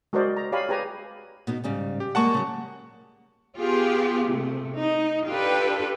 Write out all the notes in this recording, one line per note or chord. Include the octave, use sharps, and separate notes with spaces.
G#3 F#4 A#4 C5 D5 D#5
A#5
G4 C#5 D5 F5 G#5 B5
G4 G#4 B4 G#5 A#5
B2 B3 D#4
G#2 C#3 G3
G4
G3 G#3 A#3 F#5 A5 C#6
C#3 F#3
B3 F4 G4 G#4
C3 A3
D#4
D4 F4 G4 A4 B4